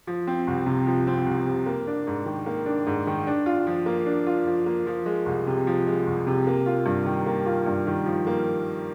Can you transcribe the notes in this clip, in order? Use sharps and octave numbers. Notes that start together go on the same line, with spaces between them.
F3
C4
C2
C3
F3
C4
C2
C3
A#3
D4
G#2
D#3
A#3
D4
G#2
D#3
D4
F4
F3
A#3
D4
F4
F3
A#3
F3
G#3
C2
C3
F3
G#3
C2
C3
A#3
F4
G2
D#3
A#3
F4
G2
D#3
F3
A#3